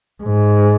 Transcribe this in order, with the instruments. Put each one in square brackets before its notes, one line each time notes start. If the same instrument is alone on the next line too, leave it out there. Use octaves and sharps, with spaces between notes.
[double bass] G#2